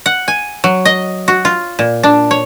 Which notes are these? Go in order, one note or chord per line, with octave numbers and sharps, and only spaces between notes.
F#5
G#5
F#3
D#5
F#4
F4
A#2
D4
C#5